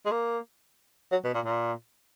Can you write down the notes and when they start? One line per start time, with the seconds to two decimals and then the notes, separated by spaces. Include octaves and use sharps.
0.06 G#3
0.11 A#3
1.12 F#3
1.24 B2
1.35 A#2
1.45 A#2